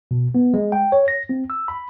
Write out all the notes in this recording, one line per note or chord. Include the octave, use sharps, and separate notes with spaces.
B2
B3
G#3
G5
C#5
A#6
C4
E6
B5